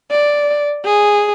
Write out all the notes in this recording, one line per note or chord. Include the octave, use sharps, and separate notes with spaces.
D5
G#4